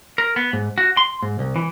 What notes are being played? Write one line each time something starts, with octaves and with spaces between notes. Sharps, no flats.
A#4
B3
G#2
F#4
C6
G#2
C2
E3